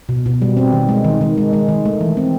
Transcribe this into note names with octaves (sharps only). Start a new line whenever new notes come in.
B2
B2
G3
C4
D#3
G#3
D#3
D#3
G#3
G#3
D#3
A3
E3
C4